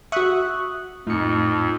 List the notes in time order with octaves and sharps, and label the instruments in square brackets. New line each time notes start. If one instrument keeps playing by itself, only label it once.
[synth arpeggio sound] F#4 E5 [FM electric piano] C#6 D#6 F#6
[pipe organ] F2 [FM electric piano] A2 C#7 [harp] D#4 F4